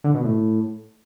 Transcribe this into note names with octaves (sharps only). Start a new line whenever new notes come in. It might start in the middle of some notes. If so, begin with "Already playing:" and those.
D3
B2
A2